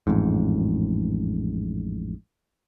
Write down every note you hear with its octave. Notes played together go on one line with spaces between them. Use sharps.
A1 F2 G#2